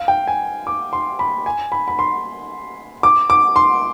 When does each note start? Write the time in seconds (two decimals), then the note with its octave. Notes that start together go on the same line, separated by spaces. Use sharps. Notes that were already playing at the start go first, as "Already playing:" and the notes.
Already playing: F5
0.08 G5
0.27 G#5
0.67 D6
0.93 C6
1.19 B5
1.46 G#5
1.72 B5
1.88 B5
1.99 C6
3.03 D6
3.30 D6
3.56 C6